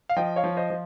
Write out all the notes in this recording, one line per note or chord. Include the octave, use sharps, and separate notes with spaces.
F5
F3 D#5 G5
C#5 F5
F3
C5 D#5
F3